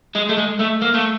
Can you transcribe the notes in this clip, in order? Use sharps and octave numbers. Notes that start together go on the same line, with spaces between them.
G#3
A3
G#3
A3
A#3
A3